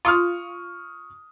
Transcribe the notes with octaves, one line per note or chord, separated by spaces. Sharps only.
F4 C#6 D#6 F6